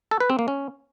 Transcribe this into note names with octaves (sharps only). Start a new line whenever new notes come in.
A4
B4
C4
A#3
C#4